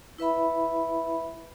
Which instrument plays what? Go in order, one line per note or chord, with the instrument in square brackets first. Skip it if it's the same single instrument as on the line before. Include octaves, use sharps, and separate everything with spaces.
[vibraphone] E4 B4 E5 B5